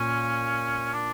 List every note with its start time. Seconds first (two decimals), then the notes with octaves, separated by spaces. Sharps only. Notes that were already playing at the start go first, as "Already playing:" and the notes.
Already playing: A#2 C#4
0.93 D4